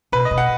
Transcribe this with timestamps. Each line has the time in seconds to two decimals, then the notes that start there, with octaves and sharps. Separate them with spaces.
0.12 B2 B4
0.25 D#5
0.31 B2
0.38 F#5